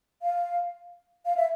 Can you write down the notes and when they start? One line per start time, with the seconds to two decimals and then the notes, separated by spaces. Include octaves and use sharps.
0.22 F5
1.25 F5
1.36 E5